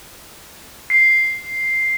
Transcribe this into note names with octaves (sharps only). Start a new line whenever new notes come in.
C7